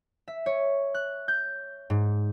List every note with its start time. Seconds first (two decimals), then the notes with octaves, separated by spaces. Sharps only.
0.28 E5
0.46 C#5
0.94 F#6
1.28 G6
1.90 G#2